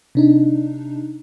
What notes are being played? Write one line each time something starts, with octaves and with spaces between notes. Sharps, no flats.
C3 D4 D#4